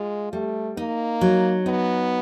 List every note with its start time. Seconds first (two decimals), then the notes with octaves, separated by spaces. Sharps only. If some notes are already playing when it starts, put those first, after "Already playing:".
Already playing: G#3 F4
0.33 G3 A3
0.77 A#3 D#4
1.21 F#3
1.66 B3 D#4